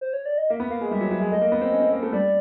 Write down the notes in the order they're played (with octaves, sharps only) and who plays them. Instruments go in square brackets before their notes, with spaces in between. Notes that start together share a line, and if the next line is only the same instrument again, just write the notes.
[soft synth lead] C5
C#5
D5
D#5
[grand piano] A#3 [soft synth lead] E5
[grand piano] B3
[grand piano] A#3 [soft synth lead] F5
[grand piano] G#3
[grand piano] G3 [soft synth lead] E5
[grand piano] F#3
F#3
G#3
[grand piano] A3 [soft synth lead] D#5
[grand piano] A#3
B3
C4
C#4
C4
A#3
A3
[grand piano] G3 [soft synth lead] D5